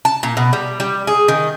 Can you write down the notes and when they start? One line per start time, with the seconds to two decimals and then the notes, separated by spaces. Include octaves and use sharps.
0.05 A5
0.23 A#2
0.37 B2
0.53 G3
0.80 G3
1.07 G#4
1.28 D#3